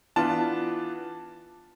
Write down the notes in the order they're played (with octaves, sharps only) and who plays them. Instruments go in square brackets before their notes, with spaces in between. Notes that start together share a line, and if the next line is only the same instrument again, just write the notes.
[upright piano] E3 B3 D4 F4 A5